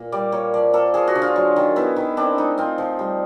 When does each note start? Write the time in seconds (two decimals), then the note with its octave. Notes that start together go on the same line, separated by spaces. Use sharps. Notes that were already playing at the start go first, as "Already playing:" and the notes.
Already playing: A#2
0.12 G3 D5
0.32 A#3 C#5
0.54 F3 D5
0.73 A#3 A4
0.94 F3 G#4
1.08 F#4
1.15 D3
1.22 F4
1.36 F#3
1.56 D#3
1.76 B3 E4
1.96 D#3
2.17 C4 D4
2.38 A3 D#4
2.58 C4 F4
2.78 F3
2.99 G3